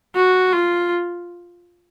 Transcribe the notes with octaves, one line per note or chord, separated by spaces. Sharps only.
F#4
F4